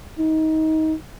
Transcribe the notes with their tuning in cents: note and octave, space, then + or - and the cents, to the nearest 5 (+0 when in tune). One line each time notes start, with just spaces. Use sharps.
D#4 +20